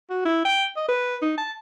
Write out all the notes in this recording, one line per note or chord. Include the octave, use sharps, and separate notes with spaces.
F#4
E4
G5
D#5
B4
D#4
A5